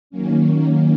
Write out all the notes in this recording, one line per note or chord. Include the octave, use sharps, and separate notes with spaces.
D#3 F#3 A#3 C#4